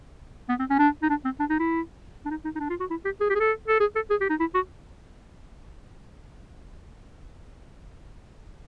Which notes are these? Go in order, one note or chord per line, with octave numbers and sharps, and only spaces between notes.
B3
C4
C#4
D4
D#4
D4
C4
D4
D#4
E4
D4
D#4
D#4
D#4
D4
F4
F#4
E4
G4
G#4
G4
G#4
A4
A4
G#4
A4
G#4
G4
D#4
E4
F#4